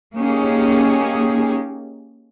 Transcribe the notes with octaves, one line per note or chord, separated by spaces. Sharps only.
A#3 C#4 D#4 G4 G#4